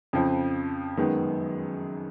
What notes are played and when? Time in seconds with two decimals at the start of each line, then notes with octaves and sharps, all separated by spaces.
0.13 F2 C#3 F3
0.97 F#2 D#3 G#3 B3